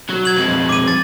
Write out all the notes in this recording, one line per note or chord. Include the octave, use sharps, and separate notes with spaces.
F#3
G#6 F#7
F2 G#3
D6 D#7
A6